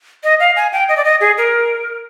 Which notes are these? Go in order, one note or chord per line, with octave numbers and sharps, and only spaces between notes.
D#5
F5
G#5
G5
D#5
D5
D#5
G#4
A#4